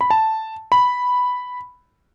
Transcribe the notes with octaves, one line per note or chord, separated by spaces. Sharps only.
B5
A5
B5